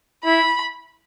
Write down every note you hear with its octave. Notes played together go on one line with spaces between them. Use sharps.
E4 B5